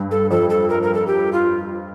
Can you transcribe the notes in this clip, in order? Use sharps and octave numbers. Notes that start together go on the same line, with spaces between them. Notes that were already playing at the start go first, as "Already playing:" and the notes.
Already playing: G2
A4
F2 A4
A4
A#4
A#4
A4
G4
F4